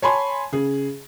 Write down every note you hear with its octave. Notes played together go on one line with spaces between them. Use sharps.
C#5 G#5 A5 B5 C6
C#3 G#4